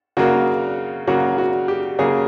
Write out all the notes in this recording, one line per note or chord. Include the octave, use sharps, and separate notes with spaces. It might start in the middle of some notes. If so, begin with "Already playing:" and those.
C#3 F#3 A#3 F#4
C#3 F#3 A#3 F#4
F#4
G4
C#3 F#3 A#3 G#4